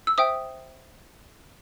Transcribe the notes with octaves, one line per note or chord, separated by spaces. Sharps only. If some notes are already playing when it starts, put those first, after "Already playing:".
E6
C5 E5 G5 D#6